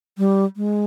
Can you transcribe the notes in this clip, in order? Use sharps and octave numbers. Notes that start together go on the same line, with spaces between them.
G3
G#3